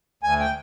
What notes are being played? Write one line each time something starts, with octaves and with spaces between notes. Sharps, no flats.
D2 G#5
G5